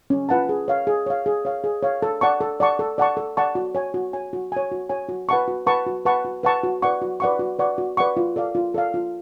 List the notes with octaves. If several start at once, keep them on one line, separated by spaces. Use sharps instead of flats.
C#4
F4 B4 F#5 A5
G#4
C#5 F5
G#4
C#5 F5
G#4
C#5 F5
G#4
C#5 F5
A4
D5 F#5 A5 C#6
A4
D5 F#5 A5 C#6
A4
D5 F#5 A5 C#6
A4
D5 F#5 A5 C#6
F#4
C#5 G#5
F#4
C#5 G#5
F#4
C#5 G#5
F#4
C#5 G#5
F#4
B4 F#5 A5 C#6
F#4
B4 F#5 A5 C#6
F#4
B4 F#5 A5 C#6
F#4
B4 F#5 A5 C#6
F#4
B4 D5 F#5 C#6
F#4
B4 D5 F#5 C#6
F#4
B4 D5 F#5 C#6
F#4
B4 D5 F#5 C#6
F4
A4 D5 F5
F4
A4 D5 F5
F4